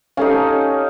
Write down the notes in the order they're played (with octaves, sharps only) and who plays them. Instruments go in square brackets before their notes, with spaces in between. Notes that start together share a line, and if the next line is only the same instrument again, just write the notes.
[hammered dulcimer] C#4 D#4 [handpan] G4 A4 F5